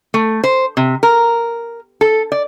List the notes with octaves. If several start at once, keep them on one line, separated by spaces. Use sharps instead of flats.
A3
C5
C3
A#4
A4
D5